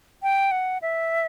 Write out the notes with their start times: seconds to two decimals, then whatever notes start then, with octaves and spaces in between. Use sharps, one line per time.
0.23 G5
0.51 F#5
0.82 E5